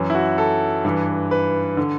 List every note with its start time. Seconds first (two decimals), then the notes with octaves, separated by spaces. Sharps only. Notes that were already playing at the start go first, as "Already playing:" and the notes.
Already playing: F#2 E3
0.10 E4
0.15 F#4
0.38 A4
0.85 G2 E3
1.31 B4
1.77 D3